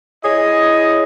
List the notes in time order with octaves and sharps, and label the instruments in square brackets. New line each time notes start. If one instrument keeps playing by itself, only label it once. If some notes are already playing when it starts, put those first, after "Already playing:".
[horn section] E4 G#4 C#5 D#5